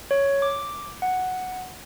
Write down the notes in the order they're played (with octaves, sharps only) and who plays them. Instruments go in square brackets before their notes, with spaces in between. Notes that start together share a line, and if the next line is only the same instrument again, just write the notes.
[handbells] C#5
D6
F#5